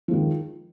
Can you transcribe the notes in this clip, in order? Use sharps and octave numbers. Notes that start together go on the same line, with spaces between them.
D#3 F3 G#3